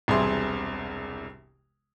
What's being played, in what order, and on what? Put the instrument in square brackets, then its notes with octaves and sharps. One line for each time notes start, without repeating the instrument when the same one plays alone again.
[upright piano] E1 C2 C3 G#4 C6